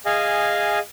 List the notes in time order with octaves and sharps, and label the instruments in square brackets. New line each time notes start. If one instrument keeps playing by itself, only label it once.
[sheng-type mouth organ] G#4 D#5 F5 G#5